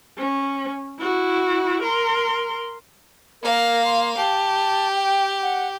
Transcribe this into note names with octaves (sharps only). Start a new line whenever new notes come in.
C#4
E4 F#4
A#4 C6
A#3 A#4 F5
C6
G4 A5
G5
F#5